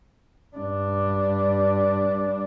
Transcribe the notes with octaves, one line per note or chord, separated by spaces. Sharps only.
G2 D4